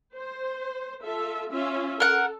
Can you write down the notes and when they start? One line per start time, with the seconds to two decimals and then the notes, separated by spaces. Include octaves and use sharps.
0.16 C5
1.03 F4 A4 E5
1.52 C#4 F4 E5
2.00 A4 A#4 F#5